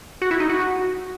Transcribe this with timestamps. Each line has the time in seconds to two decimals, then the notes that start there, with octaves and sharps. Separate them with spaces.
0.22 F#4
0.31 E4
0.40 D#4
0.49 F#4